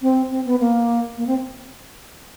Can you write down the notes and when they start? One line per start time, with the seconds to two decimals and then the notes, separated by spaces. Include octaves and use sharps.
0.02 C4
0.31 C4
0.45 B3
0.60 A#3
1.18 A#3
1.27 C4